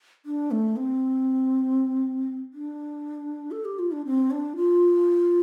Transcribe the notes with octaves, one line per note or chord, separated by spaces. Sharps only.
D4
A3
C4
D4
A4
G4
F4
D4
C4
D4
F4